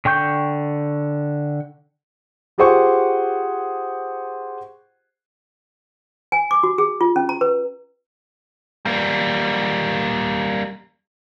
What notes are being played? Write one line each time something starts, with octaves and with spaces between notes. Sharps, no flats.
D3 G5 C#6 G6
F4 G4 G#4 C5 F#5 C#6
G#5
D6
F#4
G#4
F4
C#4
A#5
B4
G3 A#3